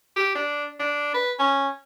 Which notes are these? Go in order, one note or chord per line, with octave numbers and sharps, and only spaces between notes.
G4
D4
D4
B4
C#4